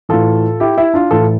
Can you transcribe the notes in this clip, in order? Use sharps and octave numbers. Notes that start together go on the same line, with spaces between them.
A2 E3 F4 A4
E4 G4
E4
D4 F4
A2 E3 F4 A4